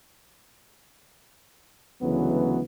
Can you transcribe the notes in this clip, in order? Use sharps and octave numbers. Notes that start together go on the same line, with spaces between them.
D2 C#3 E3 F#3 G#3 B3